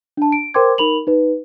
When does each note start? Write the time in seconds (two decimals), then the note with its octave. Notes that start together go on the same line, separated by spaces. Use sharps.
0.17 D4 A5
0.32 D7
0.54 A#4 C5 G5 C6 D6 G#6
0.78 D#4 A#4 B5 F7 F#7
1.07 D#4 B4